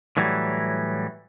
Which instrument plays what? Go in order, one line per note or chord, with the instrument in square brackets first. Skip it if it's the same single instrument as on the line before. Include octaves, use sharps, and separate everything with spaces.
[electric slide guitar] A2 E3 F#3 G3